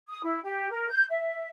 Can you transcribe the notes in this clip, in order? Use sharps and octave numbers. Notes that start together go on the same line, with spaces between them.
D#6
E4
G4
A#4
G6
E5